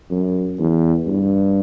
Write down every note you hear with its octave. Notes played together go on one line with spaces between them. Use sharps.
F#2
E2
G2